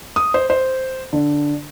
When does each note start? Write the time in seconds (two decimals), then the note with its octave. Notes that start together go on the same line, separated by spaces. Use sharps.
0.16 D#6
0.34 C5
0.50 C5
1.13 D3